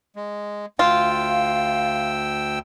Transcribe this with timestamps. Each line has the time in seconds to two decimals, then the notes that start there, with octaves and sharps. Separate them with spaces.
0.16 G#3
0.79 D2 F4 G5 E6
1.09 F5